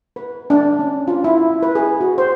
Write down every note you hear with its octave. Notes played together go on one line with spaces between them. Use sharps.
B4
D4
C#4
F4
E4
B4
G#4
F#4
C5